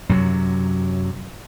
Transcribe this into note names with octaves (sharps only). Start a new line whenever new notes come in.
F#2 C3 F#3